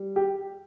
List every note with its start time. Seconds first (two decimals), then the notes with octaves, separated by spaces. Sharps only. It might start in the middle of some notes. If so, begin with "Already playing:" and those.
Already playing: G3
0.16 G4